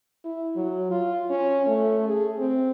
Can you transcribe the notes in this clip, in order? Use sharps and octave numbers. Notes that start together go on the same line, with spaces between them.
E4
F#3
F4
C#4
A3
G#4
C4